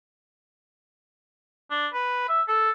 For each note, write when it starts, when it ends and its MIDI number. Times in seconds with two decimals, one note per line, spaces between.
1.71 1.87 62
1.93 2.24 71
2.29 2.42 76
2.48 2.70 69